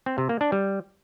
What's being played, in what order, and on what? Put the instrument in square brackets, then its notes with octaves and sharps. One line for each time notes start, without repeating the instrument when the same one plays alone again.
[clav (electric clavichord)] C4
C3
A#3
D4
G3